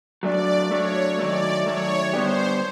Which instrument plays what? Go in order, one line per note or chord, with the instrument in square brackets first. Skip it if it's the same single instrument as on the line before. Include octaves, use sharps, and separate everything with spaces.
[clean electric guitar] F#3 A3 D4 [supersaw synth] D5
[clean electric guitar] F#3 A3 D4 [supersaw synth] C#5
[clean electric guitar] D#3 F#3 A3 [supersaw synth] D5
[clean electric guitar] D#3 F#3 A3 [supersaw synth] C#5
[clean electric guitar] D3 G3 B3 D4 G4 [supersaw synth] C5